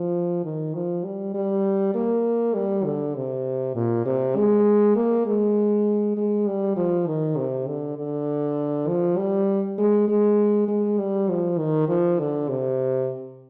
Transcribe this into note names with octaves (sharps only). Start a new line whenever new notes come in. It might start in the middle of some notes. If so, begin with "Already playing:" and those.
Already playing: F3
D#3
F3
G3
G3
A#3
G3
D3
C3
A#2
C3
G#3
A#3
G#3
G#3
G3
F3
D#3
C3
D3
D3
F3
G3
G#3
G#3
G#3
G3
F3
D#3
F3
D3
C3